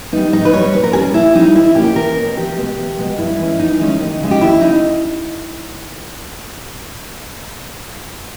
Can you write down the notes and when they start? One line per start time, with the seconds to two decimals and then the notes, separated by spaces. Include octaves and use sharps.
0.12 G3 B3 D#4
0.33 G#2 D#4
0.45 B4
0.54 G3 B3 C#5
0.73 A#2 B4
0.84 A#4
0.93 G3 C#4 G#4
1.14 A#2 E4
1.35 G3 C#4 D#4
1.55 E2 E4
1.75 B2 A#3 C#4 G4
1.96 E2 A#4
2.16 B2 A#3 C#4
2.37 E2 G4
2.57 B2 G#3 B3
2.78 E2
2.98 B2 G#3 B3
3.18 G2 E4
3.39 E3 G#3 C#4
3.59 G2 D#4
3.79 E3 G#3 C#4
4.00 D#2
4.20 C#3 G#3
4.31 G4
4.41 D#2 E4
4.61 C#3 D#4